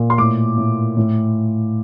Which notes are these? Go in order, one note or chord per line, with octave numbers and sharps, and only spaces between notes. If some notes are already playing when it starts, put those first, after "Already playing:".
Already playing: A#2
C6
A2 D6
A2
A2